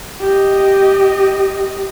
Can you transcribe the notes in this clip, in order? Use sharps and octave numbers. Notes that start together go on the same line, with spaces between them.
G4 D#5